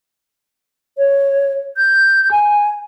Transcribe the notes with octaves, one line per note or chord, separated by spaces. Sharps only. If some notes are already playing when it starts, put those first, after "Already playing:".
C#5
G6
G#5